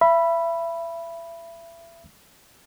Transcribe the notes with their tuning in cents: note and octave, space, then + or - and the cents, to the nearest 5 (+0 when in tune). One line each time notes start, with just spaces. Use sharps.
E5 +30 B5 -5